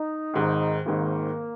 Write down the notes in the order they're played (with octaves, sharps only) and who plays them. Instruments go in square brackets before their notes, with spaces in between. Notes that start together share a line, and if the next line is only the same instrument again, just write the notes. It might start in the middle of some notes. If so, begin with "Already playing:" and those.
Already playing: [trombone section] D#4
[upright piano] G#1 G#2 D#3
[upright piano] G#1 G#2 D#3 [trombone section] A#3